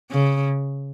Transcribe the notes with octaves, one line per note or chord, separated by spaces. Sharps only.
C#3